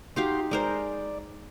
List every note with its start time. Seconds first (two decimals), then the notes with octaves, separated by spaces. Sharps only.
0.16 D#4 F#4 G4 F5 C6
0.51 G#3 A#4 C5 D5